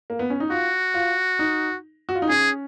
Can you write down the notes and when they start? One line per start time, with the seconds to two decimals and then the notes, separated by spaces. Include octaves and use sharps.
0.10 A#3
0.19 B3
0.30 C#4
0.40 D#4
0.50 F4 F#4
0.94 F4
1.39 D#4
2.09 F#4
2.15 F4
2.22 D#4
2.29 C#4 G#4